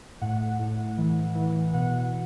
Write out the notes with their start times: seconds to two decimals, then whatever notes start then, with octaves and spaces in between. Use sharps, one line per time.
0.21 A2 F#5
0.59 A2
0.98 E3
1.35 E3
1.73 B2 F#5